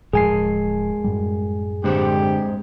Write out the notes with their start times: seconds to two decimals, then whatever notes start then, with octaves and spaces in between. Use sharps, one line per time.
0.13 D1 A2 F3 G#3 G#4 A#4 G#5 C7
1.04 F#2 A2 G3
1.84 D3 G#3 C4 G4 B4 C5